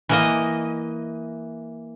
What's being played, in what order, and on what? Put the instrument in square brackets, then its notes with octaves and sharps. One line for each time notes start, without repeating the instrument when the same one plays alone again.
[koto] E3 A#3 D#5